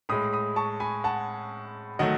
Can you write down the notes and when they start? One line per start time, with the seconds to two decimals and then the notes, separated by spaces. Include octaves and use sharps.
0.09 A2 G#3 B5 D#6
0.33 B5 D#6
0.56 A5 C#6
0.80 G#5 B5
1.04 F#5 A5
1.99 D#3 F#3 A3 D#5 F#5